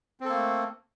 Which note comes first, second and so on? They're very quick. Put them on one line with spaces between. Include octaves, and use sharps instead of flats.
C4 A4 A#3 A3